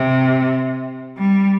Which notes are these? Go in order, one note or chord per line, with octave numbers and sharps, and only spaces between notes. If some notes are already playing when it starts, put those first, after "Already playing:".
Already playing: C3
G3